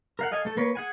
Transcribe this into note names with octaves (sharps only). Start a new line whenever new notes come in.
A#4 F5 F#5
A4 D#5 F5 G#5
A3 A4
A#3 B4 C#5
G#4 F#5 G#5